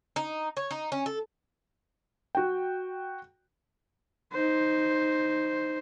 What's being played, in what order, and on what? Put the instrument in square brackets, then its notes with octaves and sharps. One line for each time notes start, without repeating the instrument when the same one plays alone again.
[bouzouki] D#4
C#5
D#4
C#4
A4
[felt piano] F#4 G5
[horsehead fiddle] D#4 C5